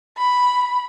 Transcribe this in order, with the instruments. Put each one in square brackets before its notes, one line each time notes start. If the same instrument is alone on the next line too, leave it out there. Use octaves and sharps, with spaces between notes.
[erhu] B5